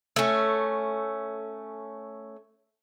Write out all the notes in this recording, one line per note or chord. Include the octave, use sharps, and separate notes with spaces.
A3 C#4